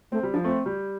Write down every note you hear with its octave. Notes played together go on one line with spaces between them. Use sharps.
A3 C4
G3
F3 D4
A3 C4
G3